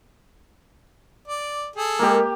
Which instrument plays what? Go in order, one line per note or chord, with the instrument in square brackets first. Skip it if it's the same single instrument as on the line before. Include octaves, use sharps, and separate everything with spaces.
[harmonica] D5
G#4 A4
[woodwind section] G#3 A#4 [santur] A#3 G4